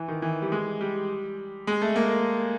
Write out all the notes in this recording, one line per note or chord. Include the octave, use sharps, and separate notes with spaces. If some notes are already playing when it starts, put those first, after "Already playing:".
Already playing: E3
D#3
E3
G3
G#3
G3
G#3
A3
A#3